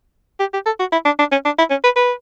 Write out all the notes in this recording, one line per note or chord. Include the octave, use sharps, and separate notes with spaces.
G4
G4
A4
F#4
E4
D4
D4
C#4
D4
E4
C#4
B4
B4